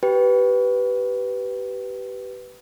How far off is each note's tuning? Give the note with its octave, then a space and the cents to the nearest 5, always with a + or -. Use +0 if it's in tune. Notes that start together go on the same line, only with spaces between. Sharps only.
G4 -25 B4 +0 G5 +0